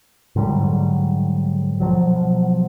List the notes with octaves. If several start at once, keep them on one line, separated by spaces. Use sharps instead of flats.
G#2 D3 F#3 G3
B2 F3 F#3